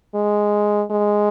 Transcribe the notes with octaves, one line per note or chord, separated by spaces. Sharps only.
G#3
G#3